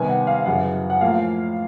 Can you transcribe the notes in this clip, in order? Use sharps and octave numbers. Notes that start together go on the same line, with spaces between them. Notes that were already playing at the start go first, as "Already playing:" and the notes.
Already playing: C3 D#3 G3 B3 G#5
F#5
F5
F#2 C#3 E3 F#5
F#5
A2 F3 A#3 F5